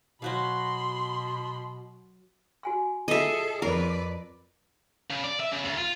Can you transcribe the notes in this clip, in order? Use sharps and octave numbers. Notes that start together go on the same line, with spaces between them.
B2 F#3 F#4 F5 B5 C6
F#4 G#5 C6
F4 G#4 A4 D#5 E5
F2 A#4 B4 D5
C#3
D5
E5
C#3
D2
F4